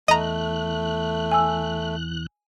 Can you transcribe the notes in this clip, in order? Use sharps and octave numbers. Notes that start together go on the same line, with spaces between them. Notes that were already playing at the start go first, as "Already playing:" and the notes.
E2 A3 D#5 A#5 F#6
G#5 E6